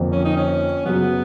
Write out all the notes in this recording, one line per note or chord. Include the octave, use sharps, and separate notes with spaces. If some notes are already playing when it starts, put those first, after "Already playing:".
Already playing: F2 D3 F3 A#3
C#4
D#4
C#4
F#2 C#3 F#3 B3